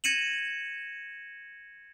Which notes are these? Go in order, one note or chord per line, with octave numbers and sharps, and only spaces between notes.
G#6 A#6 C#7 D#7 E7 F#7